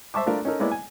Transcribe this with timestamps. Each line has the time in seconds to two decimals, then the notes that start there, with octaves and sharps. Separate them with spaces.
0.14 C5 E5 A5 C#6 D6
0.26 A3 D4 F4 A#4
0.45 C#4 D#4 A4 A#4
0.60 G#3 A#3 B3 E4 C#5 D5
0.71 G#5